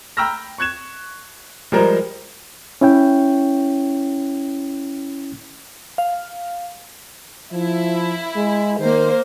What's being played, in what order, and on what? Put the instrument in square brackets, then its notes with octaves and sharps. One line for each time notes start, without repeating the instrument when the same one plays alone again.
[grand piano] G5 A#5 B5 E6 F6 A#6
C#6 F#6 G#6 E7
F3 G3 G#3 A#4 C5
[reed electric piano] C#4 E4 C#5 G5
[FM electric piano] F5
[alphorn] F3 [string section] E4
[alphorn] G#3
[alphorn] D#3 [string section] A#3 C5